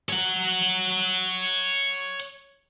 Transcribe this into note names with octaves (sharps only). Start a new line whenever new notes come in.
C#5 F#5